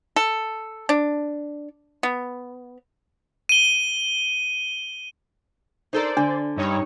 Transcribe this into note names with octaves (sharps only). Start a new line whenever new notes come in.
A4
D4
B3
D#7 G7
D#4 A4 A#4 C5 D5
D3 D4
G2 D#4 C#5